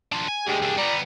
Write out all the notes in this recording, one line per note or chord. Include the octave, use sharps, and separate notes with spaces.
D4 F4
G#5
D2 G#3 G4 G#4 G5
C2 D4
G3 B3 D5 A#5